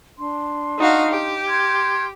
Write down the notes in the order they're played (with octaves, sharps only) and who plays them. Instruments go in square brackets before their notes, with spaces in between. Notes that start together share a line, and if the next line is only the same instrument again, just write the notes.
[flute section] D4 C6
[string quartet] D#4 F#4 F5
G4
[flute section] C6 F6 G#6